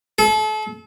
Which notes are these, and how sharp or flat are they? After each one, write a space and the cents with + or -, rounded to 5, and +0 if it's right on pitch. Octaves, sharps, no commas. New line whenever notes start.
A4 -35